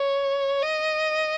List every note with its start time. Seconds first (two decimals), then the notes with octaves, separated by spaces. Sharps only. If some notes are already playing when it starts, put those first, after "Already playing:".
Already playing: C#5
0.62 D#5